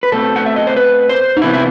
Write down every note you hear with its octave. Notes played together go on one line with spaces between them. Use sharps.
B4
B2 A3 C4 A4
F#5
E5
D#5
C5
B4
C5
D#4
C3 E3 B3 E4
E4